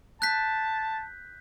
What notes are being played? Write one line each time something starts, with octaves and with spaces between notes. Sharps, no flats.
A5 F#6 G6 B6